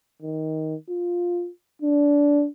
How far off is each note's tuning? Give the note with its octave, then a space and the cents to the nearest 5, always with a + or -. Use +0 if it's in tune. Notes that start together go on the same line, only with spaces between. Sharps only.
D#3 +15
F4 +5
D4 -20